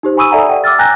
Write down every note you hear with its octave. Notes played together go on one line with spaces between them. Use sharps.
D#4 G4 C5
G#5 B5 C#6 D#6 E6 D#7
A4 D5 E5 F#5 G#5 A#5
D5 F#5 G5
D6 E6 F6 A6
G5 G#5 A#5 F#6 G6 A#6